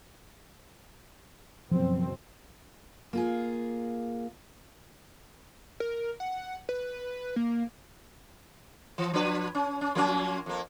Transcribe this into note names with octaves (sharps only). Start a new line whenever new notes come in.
F#1 B2 F3 F#3 C4
A#3 F4 G#4
A#4
F#5
B4
A#3
E3
F3 D4 B4
C#4
C#4
F3 A#3 C#4
F2 A#3